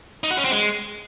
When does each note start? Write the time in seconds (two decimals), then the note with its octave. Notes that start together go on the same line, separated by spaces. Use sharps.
0.24 D#4
0.31 F#4
0.38 C#4
0.45 C4
0.52 G#3